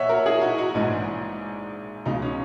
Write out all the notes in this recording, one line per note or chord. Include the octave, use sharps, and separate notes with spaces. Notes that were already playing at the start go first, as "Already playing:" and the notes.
Already playing: B1 A#2 C#5 D#5 E5 F#5
F#4 A#4
E4 G#4
D#4 F#4
D#4 F#4
A#1 G#2 E3 G#3 D#4
C#2 B2 G#3 D#4
C#4